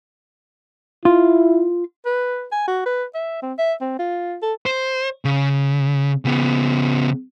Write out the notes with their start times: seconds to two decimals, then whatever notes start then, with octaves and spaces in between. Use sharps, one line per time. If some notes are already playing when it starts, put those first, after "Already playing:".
1.05 E4 F4
2.06 B4
2.52 G#5
2.67 F#4
2.86 B4
3.14 E5
3.42 C4
3.58 E5
3.81 C4
3.99 F4
4.42 A4
4.66 C5
5.25 C#3
6.25 C#3 B3